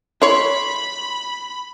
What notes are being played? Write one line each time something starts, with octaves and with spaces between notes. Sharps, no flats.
E4 C#5 B5 C6